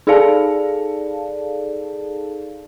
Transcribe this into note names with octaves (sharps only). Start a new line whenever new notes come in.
D#4 G#4 A4 D5 F5 A5